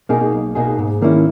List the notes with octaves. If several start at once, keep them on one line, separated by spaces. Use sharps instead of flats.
B2 A#3 D#4 G#4
B1
B2 A#3 D#4 G#4
G#2
D#3 A#3 C#4 E4